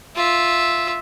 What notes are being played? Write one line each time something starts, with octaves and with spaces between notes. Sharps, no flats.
F4 E5